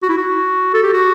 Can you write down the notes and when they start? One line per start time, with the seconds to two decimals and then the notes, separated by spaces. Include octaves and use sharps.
0.03 F#4
0.09 E4
0.18 F#4
0.74 A4
0.83 G4
0.93 F#4